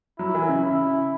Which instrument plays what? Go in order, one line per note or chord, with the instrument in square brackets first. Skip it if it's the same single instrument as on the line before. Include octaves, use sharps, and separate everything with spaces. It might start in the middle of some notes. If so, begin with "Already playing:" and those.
[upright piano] F#3 [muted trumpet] E4
[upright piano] E3
C#3
[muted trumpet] E4